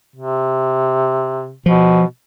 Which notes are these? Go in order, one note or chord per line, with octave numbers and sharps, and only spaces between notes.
C3
B2 F3